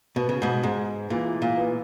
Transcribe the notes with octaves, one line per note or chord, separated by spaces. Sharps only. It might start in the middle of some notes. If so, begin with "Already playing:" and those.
B2 B3
C#3
G#2 B2
G#2 G#3
A#2 E3
A#2
B3